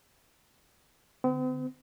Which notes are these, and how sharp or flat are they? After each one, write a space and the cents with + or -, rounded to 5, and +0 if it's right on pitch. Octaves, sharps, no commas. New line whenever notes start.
D3 +0 C4 -45